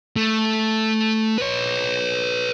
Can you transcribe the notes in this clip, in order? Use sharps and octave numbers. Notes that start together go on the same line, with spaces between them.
A3
B4 C#5